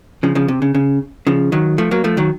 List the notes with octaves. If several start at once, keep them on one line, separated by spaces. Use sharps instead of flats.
C#3 F3
C#3 F3
C3
C#3
C#3
C#3 F3
D#3 F#3
F3 A3
F#3 A#3
F3 A3
D#3 F#3